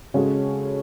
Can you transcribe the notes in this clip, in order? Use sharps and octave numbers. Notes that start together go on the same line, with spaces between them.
C#3 G#3 C#4 F#4 A4